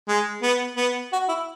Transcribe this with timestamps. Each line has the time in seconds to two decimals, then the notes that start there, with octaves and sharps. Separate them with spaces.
0.08 G#3
0.42 B3
0.77 B3
1.12 F#4
1.28 E4